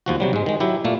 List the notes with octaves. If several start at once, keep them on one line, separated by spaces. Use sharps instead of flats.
D#2 F3 F#4
C3 F#3 G3
G#2 G#3
D#3 G#3
F#3 E4 G4
A#2 A3 A#3